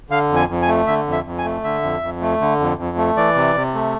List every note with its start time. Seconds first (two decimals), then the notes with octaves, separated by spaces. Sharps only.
0.10 D3 F5
0.30 F2
0.36 G#5
0.49 F2
0.62 G#5
0.68 A3
0.87 D3 E5
1.07 F2
1.12 E5
1.26 F2
1.38 G#5
1.44 A3
1.64 D3 E5
1.82 F2
2.02 F2
2.21 A3
2.41 D3
2.60 F2
2.78 F2
2.97 A3
3.17 E3 D5
3.36 C3
3.56 C3
3.75 A3